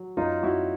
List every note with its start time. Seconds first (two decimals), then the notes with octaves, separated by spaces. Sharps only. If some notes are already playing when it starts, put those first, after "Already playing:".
Already playing: F#3
0.17 F#2 D#4 F4
0.43 F#2 E4 F#4